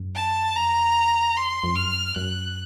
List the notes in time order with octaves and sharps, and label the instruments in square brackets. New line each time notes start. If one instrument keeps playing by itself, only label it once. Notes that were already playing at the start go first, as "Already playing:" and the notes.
Already playing: [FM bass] F#2
[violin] A5
[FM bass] F2 [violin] A#5
[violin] C6
[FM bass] F2
[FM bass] F#2 [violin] F6
[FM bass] F#2 [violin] F#6